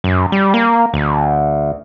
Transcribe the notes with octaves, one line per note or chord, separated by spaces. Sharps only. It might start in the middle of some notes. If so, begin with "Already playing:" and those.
F#2
G3
A#3
D2